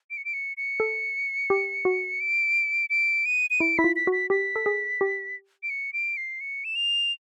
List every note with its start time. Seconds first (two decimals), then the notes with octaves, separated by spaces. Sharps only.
0.10 D7
0.17 C#7
0.25 D7
0.34 C#7
0.57 C#7
0.80 A4
1.50 G4
1.85 F#4
2.20 D7
2.90 D7
3.26 D#7
3.50 D#7
3.60 E4 D7
3.78 E4 B6
3.84 F4
3.96 B6
4.07 F#4
4.12 B6
4.30 G4 B6
4.56 A4
4.66 G#4
5.01 G4
5.63 D7
5.70 C#7
5.93 D7
6.17 C7
6.41 C#7
6.64 E7
6.75 F7